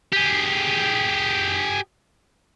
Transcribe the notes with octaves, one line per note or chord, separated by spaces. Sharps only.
G4 G#4